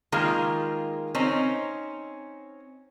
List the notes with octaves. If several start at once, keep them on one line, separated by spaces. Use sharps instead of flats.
D#3 G#3 A#3 F4
C4 C#4 D#4